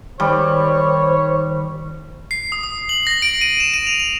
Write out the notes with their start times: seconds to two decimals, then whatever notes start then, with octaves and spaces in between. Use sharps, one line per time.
0.20 D#3 G3 C5 C#5
2.31 C7
2.52 D#6
2.63 D#6
2.89 F#7
3.07 A#6
3.22 D7
3.41 D#7
3.60 E7
3.74 D#7
3.87 F7
4.00 F7